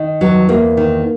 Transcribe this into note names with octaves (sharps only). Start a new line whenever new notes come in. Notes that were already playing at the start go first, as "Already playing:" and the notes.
Already playing: D#3
E2 F#3
E2 A#3
D#3